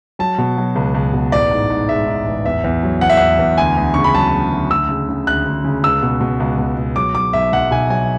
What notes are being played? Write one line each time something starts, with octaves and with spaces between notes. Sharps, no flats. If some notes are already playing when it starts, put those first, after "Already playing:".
F#3 A5
B2
F#3
C#2
C#2
B2
A1 D5
G#2
G#2
G#3 E5
G#2
A1
E2 E5
E2
F#3
E2 F#5
E5
E2 F#5
E2
D2 G#5
D2
C#3 C#6
B5
F#3 A5
D2
D2
D2 E6
C#3
C#3
D2 F#6
D2
C#3
C#2 E6
B2
B2
C#2
B2
B2
F#3 D6
F#3 D6
B1 E5
B1 F#5
B1 G#5
F#3 G#5